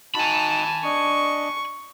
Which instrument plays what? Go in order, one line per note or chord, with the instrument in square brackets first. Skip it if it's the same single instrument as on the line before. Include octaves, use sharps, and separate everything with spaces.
[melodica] D#4 F#4 [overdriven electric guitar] G#5 B5 [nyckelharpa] A5
[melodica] D4 D#5 [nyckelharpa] C#6